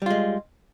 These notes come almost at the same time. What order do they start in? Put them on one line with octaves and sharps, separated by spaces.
G3 F4 G#3